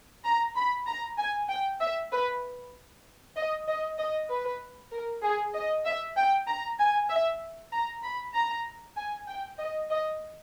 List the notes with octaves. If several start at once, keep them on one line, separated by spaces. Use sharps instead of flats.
A#5
B5
A#5
G#5
G5
E5
B4
D#5
D#5
D#5
B4
A#4
G#4
D#5
E5
G5
A#5
G#5
E5
A#5
B5
A#5
G#5
G5
D#5
D#5